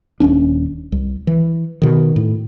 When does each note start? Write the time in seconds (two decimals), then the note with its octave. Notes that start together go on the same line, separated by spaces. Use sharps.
0.20 D#1 G#1 C#4 D4
0.92 C2
1.27 E3
1.82 B2 D#3
2.16 A2